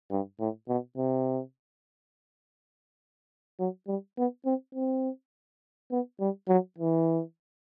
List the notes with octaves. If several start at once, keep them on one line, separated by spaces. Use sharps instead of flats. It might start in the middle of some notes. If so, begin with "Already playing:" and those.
G2
A2
B2
C3
F#3
G3
B3
C4
C4
B3
G3
F#3
E3